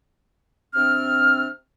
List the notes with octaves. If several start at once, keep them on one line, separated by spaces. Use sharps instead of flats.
C3 C4 D4 F6